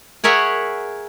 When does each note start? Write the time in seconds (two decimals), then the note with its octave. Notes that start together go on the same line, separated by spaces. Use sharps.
0.24 G#4 A#4 C#5 E5 F#5